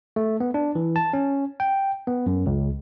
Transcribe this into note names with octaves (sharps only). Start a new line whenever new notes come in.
A3
B3
D4
E3
A5
C#4
G5
B3
F#2
C#2